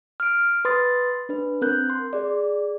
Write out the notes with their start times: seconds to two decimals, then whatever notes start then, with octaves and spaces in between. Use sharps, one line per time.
0.20 F6 D7
0.65 B4 C6 D#6 A6
1.29 D4 B4
1.62 C4 A#4 F#6 G6
1.90 C6
2.13 G#4 D5